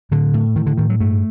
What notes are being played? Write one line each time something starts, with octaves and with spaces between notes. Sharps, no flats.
A2 D3
A2
A2 D#3
D3
A2 D#3
F#3
G2 A3